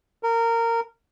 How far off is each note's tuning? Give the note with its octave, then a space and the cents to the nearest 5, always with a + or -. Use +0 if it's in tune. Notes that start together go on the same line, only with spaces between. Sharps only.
A#4 -20